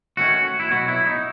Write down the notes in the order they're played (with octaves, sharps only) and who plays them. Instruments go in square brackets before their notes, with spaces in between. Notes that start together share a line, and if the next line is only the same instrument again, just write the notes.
[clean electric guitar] D#3 A3 C#4 F#4
E4
B2 F#3 B3 F#4
E4
D#4